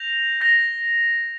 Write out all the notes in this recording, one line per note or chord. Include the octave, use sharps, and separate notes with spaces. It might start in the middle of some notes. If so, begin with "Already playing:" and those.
Already playing: G6 A#6 F7
G6 A#6 F7